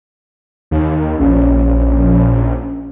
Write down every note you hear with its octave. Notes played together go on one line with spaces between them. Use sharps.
D#2
A#1 C#4